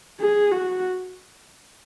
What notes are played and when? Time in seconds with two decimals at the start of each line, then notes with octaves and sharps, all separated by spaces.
0.20 G#4
0.52 F#4